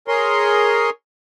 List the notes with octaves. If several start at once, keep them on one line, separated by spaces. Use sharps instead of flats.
G#4 A#4 C#5 C6